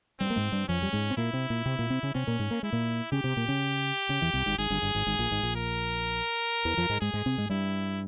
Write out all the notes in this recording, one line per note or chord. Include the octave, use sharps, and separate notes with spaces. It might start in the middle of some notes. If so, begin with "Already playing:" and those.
G2 G3 C4
A#3
G#2 G#3
G2 G3
F2 F3 C#4
G3
G#2 G#3
C4
A#2 A#3 E4
C3 C4
A#2 A#3
C3 C4
A#2 A#3
C3 C4
C#3 C#4
C3 C4 C#4
A#2 A#3
G#2 G#3
A#3
G#3 E4
A#2 A#3
C#3 C#4 G4
C3 C4
A#2 A#3
C#3 C#4
C#3 C#4
E2 E3
C2 C3
G#1 G#2
G#1 G#2 G#4
G1 G2
G1 G2
G#1 G#2
G#1 G#2
A#1 A#2
G#1 G#2
A#1 A#2
A#4
E2 E3
F2 F3
G#2 G#3
G#2 G#3 G#4
G#2 G#3
C3 C4
G#2 G#3
G2 G3 E4